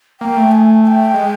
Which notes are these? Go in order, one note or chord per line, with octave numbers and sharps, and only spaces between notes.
A#3 G5
A3
G#5
G#5
G5
G#3